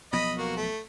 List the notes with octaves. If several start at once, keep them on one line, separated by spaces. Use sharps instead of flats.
B1 F3 B3 D#5 B5
A#3 F#4
A3